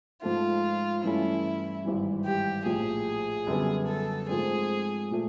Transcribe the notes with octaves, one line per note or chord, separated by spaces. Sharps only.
G#2 F3 A3 F4
G2 E3 A3 C#4 E4
G#1 G2 E3 G3
G4
A#1 A2 F3 G#4
F#2 D3 G3 B3
A4
G#2 F3 A3 C4 G#4
A#2 F3 A3